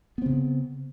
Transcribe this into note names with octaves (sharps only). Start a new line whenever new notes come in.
C#3 B3 C4